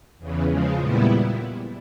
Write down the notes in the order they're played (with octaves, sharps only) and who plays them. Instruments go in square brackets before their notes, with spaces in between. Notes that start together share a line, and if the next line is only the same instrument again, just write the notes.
[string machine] E2 C#3 E3
C#3 F3 G#3
A#2 G3 B3 E4